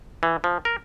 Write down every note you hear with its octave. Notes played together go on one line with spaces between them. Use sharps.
E3
F3
A#4